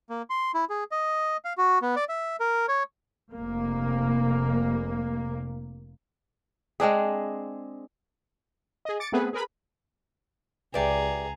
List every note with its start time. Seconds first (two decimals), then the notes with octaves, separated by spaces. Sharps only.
0.10 A#3
0.30 C6
0.54 E4
0.70 G#4
0.92 D#5
1.45 F5
1.58 F#4
1.82 B3
1.96 D5
2.09 E5
2.40 A#4
2.68 C#5
3.32 F1 A#3
6.80 G#3 C4 D4 G#4
8.85 G#4 D#5
9.00 D6 A6 C#7 D7
9.12 A3 B3 C4 G#4 A4 B4
9.33 G#4 A#4 B4 B5
10.74 C#2 G4 G#4 B4 D5 E5 G5 A#5